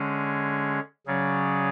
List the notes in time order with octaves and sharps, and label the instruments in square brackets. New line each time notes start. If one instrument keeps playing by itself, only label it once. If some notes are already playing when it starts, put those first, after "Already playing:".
Already playing: [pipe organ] D3 G#3 C#4 G#4
C#3 F#3 C#4 G#4 D5